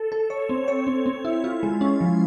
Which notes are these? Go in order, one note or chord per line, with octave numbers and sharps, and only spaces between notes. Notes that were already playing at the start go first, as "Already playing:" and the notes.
Already playing: A4
A4
C#5
C4
C#5
C4
C4
E4
F4
G#3
C#4
F3